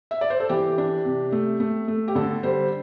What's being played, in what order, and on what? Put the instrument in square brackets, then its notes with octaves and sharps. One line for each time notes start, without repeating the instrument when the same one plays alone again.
[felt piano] E5
D5
C5
A4
E3 G4
D4
C3
A3
A3
A3
G4
D3 A4
G3 C5